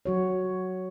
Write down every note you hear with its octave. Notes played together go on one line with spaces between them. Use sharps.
F#3 F#4 C#5